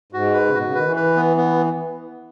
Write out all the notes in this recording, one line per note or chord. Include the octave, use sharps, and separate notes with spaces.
G#2 F#4
B4
C#3
B2 F#4
C#3
D#3 B4
E3
B4
B3
B3